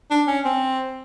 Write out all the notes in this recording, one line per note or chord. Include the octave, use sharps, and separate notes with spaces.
D4
C#4
C4